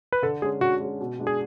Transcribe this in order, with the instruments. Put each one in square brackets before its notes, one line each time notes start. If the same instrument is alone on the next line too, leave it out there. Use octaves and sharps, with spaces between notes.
[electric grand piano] B4
[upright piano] D3 [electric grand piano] A4
[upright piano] G#3 C#4 [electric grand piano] G#4
[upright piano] D3 [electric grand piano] F#4
[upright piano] G#3 C#4
B2
G#3 D4
[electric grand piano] G#4